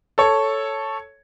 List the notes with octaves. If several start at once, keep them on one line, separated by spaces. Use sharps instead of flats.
A4 C#5